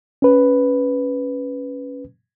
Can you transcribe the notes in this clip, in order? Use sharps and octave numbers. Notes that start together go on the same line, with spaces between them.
C#4 B4